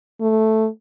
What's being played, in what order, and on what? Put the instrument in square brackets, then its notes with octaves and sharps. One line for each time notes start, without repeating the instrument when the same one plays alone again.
[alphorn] A3